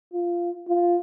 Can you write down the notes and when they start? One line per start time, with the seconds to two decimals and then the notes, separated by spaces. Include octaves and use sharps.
0.13 F4
0.68 F4